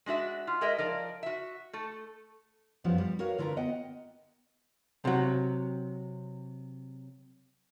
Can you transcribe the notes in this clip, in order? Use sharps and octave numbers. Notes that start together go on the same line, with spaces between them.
G#3 D4 F#4 E5
F4
G#3 G#4 A#4 D#5 E5
F3 A#4 D5 F5
F#4 E5
A3 A4
F#2 F3 G3 B3
G3
F#4 A#4 B4 C#5 F5
D3 F4 A#4 B4 A#5
B3 D#5 F#5 G5
C3 F#3